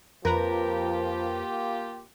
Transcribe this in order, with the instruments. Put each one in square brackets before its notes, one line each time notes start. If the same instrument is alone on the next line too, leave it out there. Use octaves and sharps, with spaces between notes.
[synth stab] F2 B4 A#5 [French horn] F3 [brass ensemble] A#3 F4 G4 [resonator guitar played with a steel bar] A#4